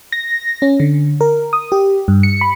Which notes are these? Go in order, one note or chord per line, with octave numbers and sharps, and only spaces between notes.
A#6
C#4
D3
A#4
D#6
G4
G2
C#7
B5